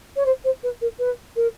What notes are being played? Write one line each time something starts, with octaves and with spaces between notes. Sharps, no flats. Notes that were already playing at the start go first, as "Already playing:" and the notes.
C#5
C5
C5
B4
A#4
B4
A#4